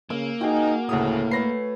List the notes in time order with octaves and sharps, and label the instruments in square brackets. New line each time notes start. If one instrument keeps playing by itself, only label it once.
[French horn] C#3 [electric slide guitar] A#3 [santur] E6
[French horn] D#4 [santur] F#4 G#5 [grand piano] G#4 G5
[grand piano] D2 C#3 D#6 [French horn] A2
[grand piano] A3 A#6 C7 [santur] B4 C#5